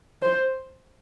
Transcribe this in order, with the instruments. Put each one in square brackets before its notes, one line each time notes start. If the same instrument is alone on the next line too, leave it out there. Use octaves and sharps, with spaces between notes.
[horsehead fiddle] C5